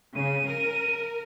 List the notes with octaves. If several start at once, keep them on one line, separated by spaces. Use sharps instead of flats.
C#3 D#7
A#4